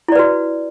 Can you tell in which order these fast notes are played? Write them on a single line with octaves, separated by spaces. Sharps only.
E4 D5 B4 F#4